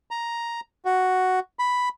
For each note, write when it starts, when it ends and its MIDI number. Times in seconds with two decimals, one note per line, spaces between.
0.11 0.60 82
0.85 1.39 66
1.59 1.89 83